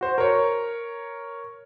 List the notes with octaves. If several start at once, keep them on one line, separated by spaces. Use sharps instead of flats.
F#4 C5
A#4 C#5